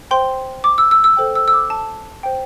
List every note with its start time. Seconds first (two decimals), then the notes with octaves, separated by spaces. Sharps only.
0.11 C5 G5 C6
0.64 D6
0.78 E6
0.91 E6
1.04 E6
1.17 A4 C5 G5
1.35 E6
1.48 E6
1.53 D6
1.70 A5
2.23 C5 G5